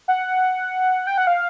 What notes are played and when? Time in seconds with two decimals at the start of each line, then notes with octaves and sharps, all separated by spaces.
0.08 F#5
1.07 G5
1.18 F#5
1.27 F5